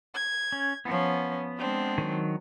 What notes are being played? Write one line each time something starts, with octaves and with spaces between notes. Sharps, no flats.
G#6
C#4
F3 B3 C#4
G#3 C4 D4
D#3 F#3